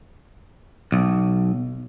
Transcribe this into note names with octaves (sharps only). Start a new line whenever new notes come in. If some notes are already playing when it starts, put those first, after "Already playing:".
B1